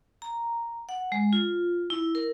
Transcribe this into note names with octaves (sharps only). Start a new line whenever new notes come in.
A#5
F#5
G#3
F4
E4
A#4